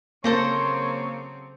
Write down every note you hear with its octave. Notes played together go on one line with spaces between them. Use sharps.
C#3 F#3 A#3 C4 A4 C5 C#5 A#5